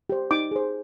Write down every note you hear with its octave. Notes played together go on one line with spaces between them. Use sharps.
G4 C5
D#4 D6
G#4 C5